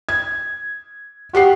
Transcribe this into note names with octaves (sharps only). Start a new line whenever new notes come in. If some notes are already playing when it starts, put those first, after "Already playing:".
G#6
F#4 G4 F#5 C7